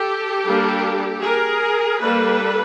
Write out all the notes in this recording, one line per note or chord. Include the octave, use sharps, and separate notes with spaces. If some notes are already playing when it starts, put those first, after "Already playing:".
Already playing: G4 A4
G3 A#3 D4
G#4 A#4
G3 A#3 D4 A4 B4